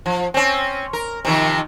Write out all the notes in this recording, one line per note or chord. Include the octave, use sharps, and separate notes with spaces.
F3
C4 C#4
A#4
C3 D#3 F3